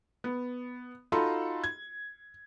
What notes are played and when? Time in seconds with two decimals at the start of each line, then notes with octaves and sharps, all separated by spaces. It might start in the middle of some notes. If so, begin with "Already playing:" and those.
0.24 B3
1.12 D#4 F4 F#4 A4 B5 C6
1.64 G#6